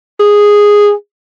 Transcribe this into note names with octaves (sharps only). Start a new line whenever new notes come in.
G#4